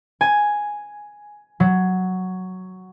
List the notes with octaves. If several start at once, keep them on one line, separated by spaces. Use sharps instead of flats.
G#5
F#3